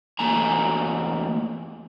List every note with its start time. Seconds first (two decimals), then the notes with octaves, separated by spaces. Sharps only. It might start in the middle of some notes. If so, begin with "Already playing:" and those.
0.19 E2 A3 A#3 G#5 A#5